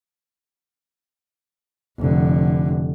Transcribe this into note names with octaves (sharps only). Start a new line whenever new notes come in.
F1 D3